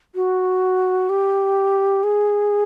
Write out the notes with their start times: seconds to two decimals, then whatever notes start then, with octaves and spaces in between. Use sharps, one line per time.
0.15 F#4
1.09 G4
2.03 G#4